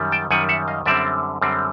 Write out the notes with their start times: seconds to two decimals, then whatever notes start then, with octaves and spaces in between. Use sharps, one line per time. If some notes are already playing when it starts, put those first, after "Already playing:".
Already playing: F#2 D#3 G3
0.12 G5 A5
0.31 F#2 D#3 G3 F#5 G#5
0.49 E5 F#5
0.68 D#5 F5
0.86 F#2 D3 G3 C4 D5 E5
1.41 F#2 D3 G3 C4